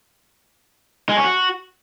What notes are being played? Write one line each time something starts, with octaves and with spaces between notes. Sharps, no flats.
G#3
C#4
F#4